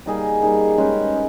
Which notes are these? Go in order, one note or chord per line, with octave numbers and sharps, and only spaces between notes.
G3 A#3 D#4 G#4
G3 A#3 D#4 G#4
G#3 C#4 G4 B4